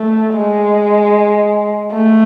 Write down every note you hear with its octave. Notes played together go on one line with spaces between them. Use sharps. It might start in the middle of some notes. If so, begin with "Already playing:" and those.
Already playing: A3
G#3
A3